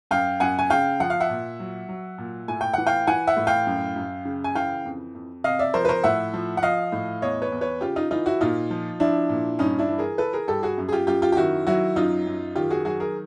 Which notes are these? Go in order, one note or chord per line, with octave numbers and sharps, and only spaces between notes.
F#2 F5 G5
F#2 F#5 G#5
G#5
C#3 F5 G5
F3 F#5
F5
E5 F#5
A#2
F#3
F#3
A#2
A2 G#5
G5
E3 F#5
F5 G5
E3 F#5 G#5
E5 F#5
A2
F5 G5
F#2
F#2
C#3
G#5
E3 F5 G5
F2
F2
C3 D#5 F5
D5 E5
F3 A#4 C5
B4
A#4 C5
A2 E5 F#5
F3
F#5
F3 D#5 F5
A2
E2 C#5 D#5
B4 C#5
E2
B4 C#5
C#3 F4 G4
D#4 F4
E3 D#4 F4
E4 F#4
A#2 D#4 F4
F3
F3 D4 E4
A#2
G2 C#4 D#4
D4 E4
E3
G#4 A#4
E3 A4 B4
G#4 A#4
G2 G4 A4
F#4 G#4
F#2
G#4
F4 G4
F#2 F4 G4
F4 G4
G4
D#3 E4 F#4
F#3 E4 F#4
F#2 D#4 F4
F#2
D#3 F4 G4
F#4 G#4
F#3 F#4 G#4
G#4 A#4